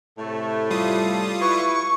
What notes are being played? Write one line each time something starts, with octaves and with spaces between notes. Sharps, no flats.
A2 C3 A3
G3 F4 D#6
E4 B4 C#6